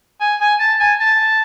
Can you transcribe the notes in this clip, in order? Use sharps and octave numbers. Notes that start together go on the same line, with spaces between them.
G#5
G#5
A5
G#5
A5